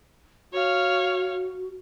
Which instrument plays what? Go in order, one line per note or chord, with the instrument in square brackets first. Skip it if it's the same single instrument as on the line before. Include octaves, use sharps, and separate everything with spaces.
[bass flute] F#4 [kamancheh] C#5 F5